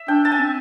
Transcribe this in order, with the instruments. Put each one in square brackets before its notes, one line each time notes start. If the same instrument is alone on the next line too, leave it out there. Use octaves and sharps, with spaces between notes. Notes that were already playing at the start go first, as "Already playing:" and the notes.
Already playing: [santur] E5
[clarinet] D4 [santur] G5
[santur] A5
G#5
[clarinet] C4